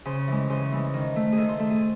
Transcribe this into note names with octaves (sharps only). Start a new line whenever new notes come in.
C#3 C5
E3 G#3
C#3 C5
E3 G#3
D#3
A3
G#4
D#3 A4
C5
A3 A4
G#4